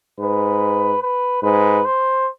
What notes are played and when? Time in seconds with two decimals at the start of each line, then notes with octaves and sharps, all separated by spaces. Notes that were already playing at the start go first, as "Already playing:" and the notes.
0.19 G#2 B4
1.02 B4
1.43 G#2 B4
1.85 C5